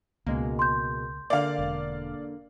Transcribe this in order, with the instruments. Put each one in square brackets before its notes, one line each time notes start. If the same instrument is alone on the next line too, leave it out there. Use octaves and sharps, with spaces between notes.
[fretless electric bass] C#2 [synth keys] B2 G#3 A#3
[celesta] C6 G6
[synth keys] D3 A#3 [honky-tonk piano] D5 F5
[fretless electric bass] E1